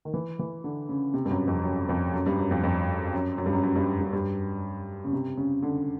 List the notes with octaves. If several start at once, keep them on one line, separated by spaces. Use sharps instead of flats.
D#3
E3
E3
D3
C#3
C3
G2
F#2
F2
F#2
F2
F#2
G2
F#2
F2
F2
F#2
F#2
G2
F#2
F#2
G2
G2
G2
C#3
C3
C#3
D3